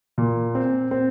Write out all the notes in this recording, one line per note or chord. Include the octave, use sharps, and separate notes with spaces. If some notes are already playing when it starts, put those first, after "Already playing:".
A#2
C4
C4